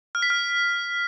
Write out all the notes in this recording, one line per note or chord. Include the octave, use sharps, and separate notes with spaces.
F6
B6
F6